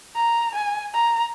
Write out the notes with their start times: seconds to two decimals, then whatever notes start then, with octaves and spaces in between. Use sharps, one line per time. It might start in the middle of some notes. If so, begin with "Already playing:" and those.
0.15 A#5
0.55 G#5
0.94 A#5